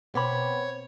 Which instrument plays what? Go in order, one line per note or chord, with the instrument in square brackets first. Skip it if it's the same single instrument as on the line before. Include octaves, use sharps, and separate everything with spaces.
[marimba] B2 D6 [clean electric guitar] B3 B5 [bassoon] C4 [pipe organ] C#5